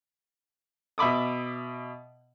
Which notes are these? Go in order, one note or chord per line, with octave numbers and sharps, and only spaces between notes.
B2 E5 B5 D6 D#6